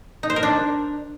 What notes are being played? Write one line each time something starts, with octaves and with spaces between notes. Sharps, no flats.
D#4
C5
A#4
D4